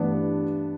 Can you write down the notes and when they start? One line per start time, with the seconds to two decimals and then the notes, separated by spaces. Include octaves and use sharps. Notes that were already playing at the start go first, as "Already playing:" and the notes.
Already playing: G2 E3 A3 B3 D4 E4